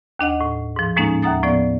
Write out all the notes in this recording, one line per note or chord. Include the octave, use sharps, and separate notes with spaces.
D#2 D4 D#5 F#5
A2
G#2 F3
A2 F3 G#3 A#3 C#4 D#4
D#2 E5 F#5 A#5 D#6 A6
A2 F3 B3 D5